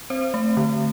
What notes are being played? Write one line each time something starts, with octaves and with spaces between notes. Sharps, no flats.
C4 C5
A3
D3